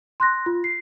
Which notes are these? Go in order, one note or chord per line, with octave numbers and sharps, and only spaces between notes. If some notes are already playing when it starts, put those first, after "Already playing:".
C6 F#6 A#6
F4
C7